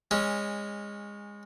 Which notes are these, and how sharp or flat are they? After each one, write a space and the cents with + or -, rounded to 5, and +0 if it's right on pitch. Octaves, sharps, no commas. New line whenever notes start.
G#3 -25 C#4 -15